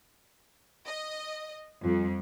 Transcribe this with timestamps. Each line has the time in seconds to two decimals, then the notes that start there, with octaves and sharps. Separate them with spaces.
0.86 D#5
1.84 F2 G3 F4